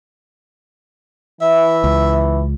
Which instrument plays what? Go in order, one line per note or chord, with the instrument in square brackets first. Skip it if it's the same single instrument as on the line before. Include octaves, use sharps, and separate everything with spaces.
[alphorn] E3 [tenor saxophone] E5
[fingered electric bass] C#2